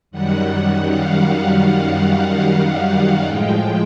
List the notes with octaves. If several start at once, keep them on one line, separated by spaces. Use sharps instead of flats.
F#2 D#3 G3 F#5
F5
F#5
A2 F3 G#3 G5